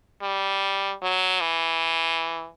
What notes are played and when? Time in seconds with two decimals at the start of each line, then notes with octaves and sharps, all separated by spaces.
0.22 G3
1.02 F#3
1.41 E3